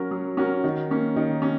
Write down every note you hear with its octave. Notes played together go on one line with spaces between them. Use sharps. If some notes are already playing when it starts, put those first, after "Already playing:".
Already playing: F#3 C#4 F#4 A#4
F#3
C#4 F#4 A#4
D#3
A#3 C#4
D#3
C#4